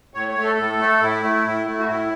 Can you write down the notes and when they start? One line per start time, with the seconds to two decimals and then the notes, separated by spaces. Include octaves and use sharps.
0.14 A2 C#5
0.29 C#5
0.36 A3
0.43 A4
0.58 A2
0.79 A3
1.00 A2 E4
1.22 A3
1.44 A2
1.66 A3
1.79 F#4
1.86 A2 E4